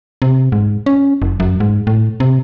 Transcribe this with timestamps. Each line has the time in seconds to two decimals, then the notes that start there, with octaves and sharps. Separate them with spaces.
0.22 C3
0.52 G#2
0.86 C#4
1.22 F#1
1.40 F#2
1.60 G#2
1.87 A2
2.20 C3